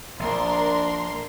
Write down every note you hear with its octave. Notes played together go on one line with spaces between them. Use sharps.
A#1 D4 A#4 F5 C6